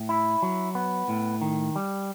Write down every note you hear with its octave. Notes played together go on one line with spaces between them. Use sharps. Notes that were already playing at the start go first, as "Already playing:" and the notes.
Already playing: A2
E4
F#3
B3
A2
D#3
G3